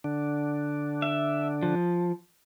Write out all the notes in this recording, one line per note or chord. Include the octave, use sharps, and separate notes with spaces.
D3 D4
E5
F3